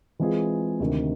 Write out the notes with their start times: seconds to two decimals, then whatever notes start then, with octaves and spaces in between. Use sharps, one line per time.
0.19 E3 G#3 C4 F4 G#4
0.80 D2 C3 D#3